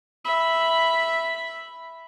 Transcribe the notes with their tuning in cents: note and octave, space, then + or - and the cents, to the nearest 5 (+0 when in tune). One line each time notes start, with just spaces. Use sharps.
E5 +0 B5 +0